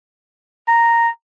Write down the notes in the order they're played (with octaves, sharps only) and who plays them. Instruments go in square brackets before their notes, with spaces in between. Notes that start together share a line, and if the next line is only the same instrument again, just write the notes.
[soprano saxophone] A#5